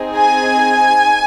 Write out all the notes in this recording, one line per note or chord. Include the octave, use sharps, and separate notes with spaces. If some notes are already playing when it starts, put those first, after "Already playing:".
Already playing: C4 D#4 G#4
G#5